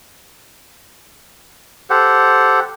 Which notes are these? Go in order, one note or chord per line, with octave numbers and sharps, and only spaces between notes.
G4 A4 C5 F#5